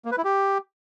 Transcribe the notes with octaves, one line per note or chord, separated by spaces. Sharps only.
A#3
B4
E4
G4